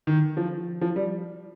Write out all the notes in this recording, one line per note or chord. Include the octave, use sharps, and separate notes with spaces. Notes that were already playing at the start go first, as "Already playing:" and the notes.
D#3
F3
F3
G3